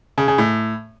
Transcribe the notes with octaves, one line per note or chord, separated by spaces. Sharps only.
C#3
C#3
A2